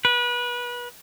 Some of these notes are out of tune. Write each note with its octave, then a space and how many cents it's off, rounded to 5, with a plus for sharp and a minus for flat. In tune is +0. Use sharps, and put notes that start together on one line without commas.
B4 -30